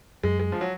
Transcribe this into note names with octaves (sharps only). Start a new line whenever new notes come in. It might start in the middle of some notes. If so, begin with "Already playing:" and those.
F#2 G#3
G#3
F3
F#3